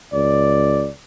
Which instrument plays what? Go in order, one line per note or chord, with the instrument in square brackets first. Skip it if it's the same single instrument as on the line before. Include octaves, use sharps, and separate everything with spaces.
[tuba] C#2 [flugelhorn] D5